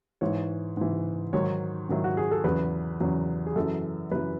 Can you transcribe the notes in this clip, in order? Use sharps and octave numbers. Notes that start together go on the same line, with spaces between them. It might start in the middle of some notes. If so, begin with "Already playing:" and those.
G#2 E3 C#5
G#2 E3
G#2 D#3 F#3 C#5
G#2 D#3 F#3 E4
F#4
G#4
A4
E2 C#3 F#3 B4
E2 C#3 F#3
G#4
F#2 E3 A4
F#2 E3 B4